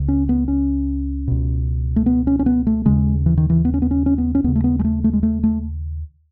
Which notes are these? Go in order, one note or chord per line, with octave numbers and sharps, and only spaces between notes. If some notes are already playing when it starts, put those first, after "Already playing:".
Already playing: C#2 C#3
C#4
B3
C#4
C#2 B2
A3
B3
C#4
C#4
B3
A3
D#2 C#3 G#3
E3
D#3
E3
B3
C#4
B3
C#4
C#4
B3
C#4
D#2 C#3 B3
A3
B3
G#3
A3
A3
G#3
A3
A3